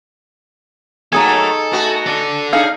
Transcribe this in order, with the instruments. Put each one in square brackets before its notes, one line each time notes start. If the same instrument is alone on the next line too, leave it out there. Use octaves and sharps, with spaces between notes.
[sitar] F#3 A3 A#3 [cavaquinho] D#4 G#4 G#5 [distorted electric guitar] A4
[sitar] A3 B3 F#4
[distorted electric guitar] A4 D5
[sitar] D4 D#4 G#4 [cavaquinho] F5